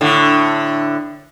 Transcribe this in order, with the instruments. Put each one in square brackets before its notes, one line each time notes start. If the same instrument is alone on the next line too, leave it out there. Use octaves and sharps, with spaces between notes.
[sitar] A2 D3